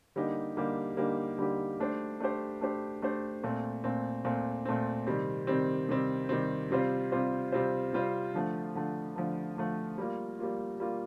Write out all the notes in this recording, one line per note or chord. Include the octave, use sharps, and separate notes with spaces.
D3 G3 A#3 D#4 G4
D3 G3 A#3 D#4 G4
D3 G3 A#3 D#4 G4
D3 G3 A#3 D#4 G4
A3 D4 G4 C5
A3 D4 G4 C5
A3 D4 G4 C5
A3 D4 G4 C5
A#2 A3 C4
A#2 A3 C4
A#2 A3 C4
A#2 A3 C4
C3 D#3 G3 C4
C3 D#3 G3 C4
C3 D#3 G3 C4
C3 D#3 G3 C4
C3 G3 C4 F4 C5
C3 G3 C4 F4 C5
C3 G3 C4 F4 C5
C3 G3 C4 F4 C5
D3 F3 A3
D3 F3 A3
D3 F3 A3
D3 F3 A3
G3 A#3 F4
G3 A#3 F4
G3 A#3 F4